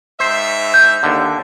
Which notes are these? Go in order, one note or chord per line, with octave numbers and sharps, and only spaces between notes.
G#2 C5 E5
G6
D#2 D3